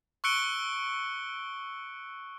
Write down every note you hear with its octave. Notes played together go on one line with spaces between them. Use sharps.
C#6 E6 F#6 C#7 D7 G7